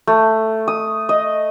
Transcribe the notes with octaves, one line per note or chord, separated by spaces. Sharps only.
A3
D#6
D#5